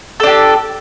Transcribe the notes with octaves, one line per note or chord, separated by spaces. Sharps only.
D4 G4 A4